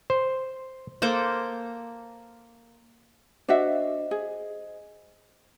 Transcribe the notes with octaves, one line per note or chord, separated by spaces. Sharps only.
C5
A#3 A4 C5 D6
D4 F#4 C5 D#5 E5
G#4